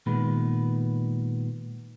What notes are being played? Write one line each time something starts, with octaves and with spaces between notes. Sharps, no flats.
A#2 D#3 G#3 B3 B4